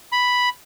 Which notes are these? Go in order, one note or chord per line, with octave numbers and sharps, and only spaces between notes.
B5